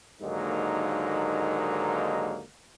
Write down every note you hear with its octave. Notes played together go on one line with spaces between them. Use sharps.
D#2 G#2 D3 F#3 A#3 D#4